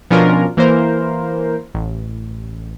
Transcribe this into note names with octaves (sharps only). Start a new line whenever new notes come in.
B2 F3 C#4 D4 F4 A#4
E3 A#3 A#4 C5
A1